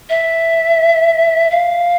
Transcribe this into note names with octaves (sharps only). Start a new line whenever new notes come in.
E5
F5